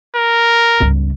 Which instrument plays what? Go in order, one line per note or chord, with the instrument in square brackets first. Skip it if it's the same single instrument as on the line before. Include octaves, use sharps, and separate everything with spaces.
[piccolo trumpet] A#4
[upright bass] G1 C#2